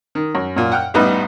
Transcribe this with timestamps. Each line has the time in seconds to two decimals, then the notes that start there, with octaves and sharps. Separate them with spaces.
0.15 D#3
0.35 F#2
0.57 F#2 A#2
0.72 F#5 G5 F6
0.94 A1 G3 B3 D#4 B4